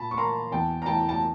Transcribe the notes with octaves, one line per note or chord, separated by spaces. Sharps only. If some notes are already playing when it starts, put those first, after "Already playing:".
Already playing: A#2 A5 B5
C#6
A#3 A#5 C6
E2 G5 A5
A#5
E3 G5 A5
A5